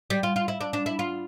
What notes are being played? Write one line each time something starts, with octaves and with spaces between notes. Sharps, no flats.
G3
F4
F4
E4
D4
D4
E4
F4